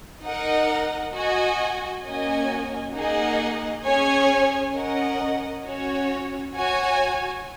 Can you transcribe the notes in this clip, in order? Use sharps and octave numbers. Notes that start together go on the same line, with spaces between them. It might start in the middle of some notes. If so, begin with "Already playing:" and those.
D#4 A#4 D#5 F#5
F#4 D#5 G#5
A#3 C#4 F#4 D#5 G#5
A#3 D#4 G#4 D#5 F#5
C#4 G#4 C#5 G#5
C#4 A#4 D#5 F#5
C#4 F#4 C#5
F#4 C#5 G#5